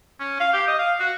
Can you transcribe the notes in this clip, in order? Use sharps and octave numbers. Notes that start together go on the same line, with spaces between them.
C#4
F5
G4
D#5
F5
F#4